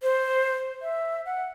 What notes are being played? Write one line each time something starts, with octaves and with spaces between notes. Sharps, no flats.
C5
E5
F#5